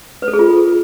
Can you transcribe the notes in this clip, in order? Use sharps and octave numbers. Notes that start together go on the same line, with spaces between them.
B4
A4
G#4
F4